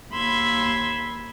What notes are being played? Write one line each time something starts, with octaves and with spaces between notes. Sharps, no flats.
D#2 B5 C6 E6 G#6